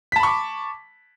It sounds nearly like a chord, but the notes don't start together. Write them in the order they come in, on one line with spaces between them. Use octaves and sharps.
B6 A5 B5 C#6 D6